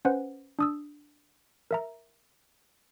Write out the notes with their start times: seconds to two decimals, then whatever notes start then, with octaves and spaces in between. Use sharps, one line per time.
0.05 C#4 B4 C5 F#5
0.59 D4 D#6 E6
1.71 A#4 E5 A#5